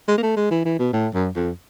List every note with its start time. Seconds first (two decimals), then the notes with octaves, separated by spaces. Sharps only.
0.08 G#3
0.18 A#3
0.23 A3
0.37 G#3
0.51 E3
0.65 E3
0.79 B2
0.93 A2
1.14 F#2
1.36 F2